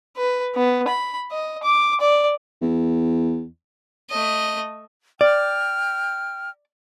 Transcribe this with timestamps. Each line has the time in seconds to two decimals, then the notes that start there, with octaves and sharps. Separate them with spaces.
0.17 B4
0.55 B3
0.87 B5
1.31 D#5
1.63 D6
2.01 D5
2.62 E2
4.10 A3 D#5
5.21 D5 G5 F6